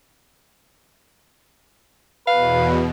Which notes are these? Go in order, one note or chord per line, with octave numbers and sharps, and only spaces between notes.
E2 B2 B4 F5